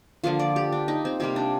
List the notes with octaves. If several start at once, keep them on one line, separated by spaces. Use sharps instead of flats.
D3 F3 A#3 F4
D5
G4
D4
D#4
C4
C3 G3 A#3 C4
D4